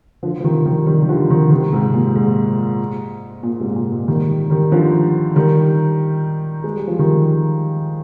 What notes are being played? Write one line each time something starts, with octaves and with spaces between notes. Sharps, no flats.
D3 F3
F3
C3 D#3
D#3 G3
D#3 G3
D#3
D3 F3
C3 D#3
C3 D#3
G#2 C3
A#2
G#2
A#2
G#2 C3
A#2
G#2
D#3 G3
D#3 G3
D3 F3
D#3 G3
G#3
G3
F3
D#3 G3